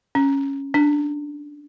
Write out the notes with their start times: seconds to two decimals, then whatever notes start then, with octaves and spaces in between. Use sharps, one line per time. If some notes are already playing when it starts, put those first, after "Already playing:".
0.15 C#4
0.74 D4